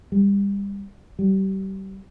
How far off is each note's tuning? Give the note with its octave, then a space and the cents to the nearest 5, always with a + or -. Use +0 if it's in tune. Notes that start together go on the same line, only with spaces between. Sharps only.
G3 +30
G3 -30